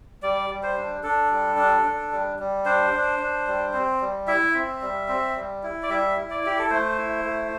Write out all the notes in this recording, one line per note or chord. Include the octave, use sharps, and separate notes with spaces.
G3 D5
G3
C5
D4
D4 A4
G3
D4
D4
G3
G3
D4 C5
D4
D4
G3
C4
G3
E4 E5
C4
G3
C4
G3
E4
D5
G3 E5
E4
D5
E4 G4
A4
A3 C5
E4
A3